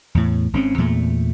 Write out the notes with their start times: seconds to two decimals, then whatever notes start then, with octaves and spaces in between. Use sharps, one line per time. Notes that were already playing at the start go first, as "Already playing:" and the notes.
0.15 E2 A2
0.53 G#1 C4 C#4
0.78 E2 A#2 A3